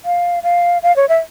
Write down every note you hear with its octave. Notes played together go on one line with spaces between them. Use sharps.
F5
F5
F5
C#5
E5